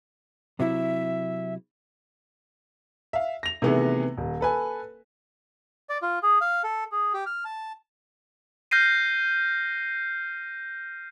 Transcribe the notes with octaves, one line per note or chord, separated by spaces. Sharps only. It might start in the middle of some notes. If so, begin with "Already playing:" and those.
C3 F#3 E4 E5
E5 F5
A#6 F7
C3 D#3 E3 A3 B3 G#4
D#1
A4 B4 G#5
D5
F4
G#4
F5
A4
G#4
G4
F6
A5
F6 G6 A#6 C7 D#7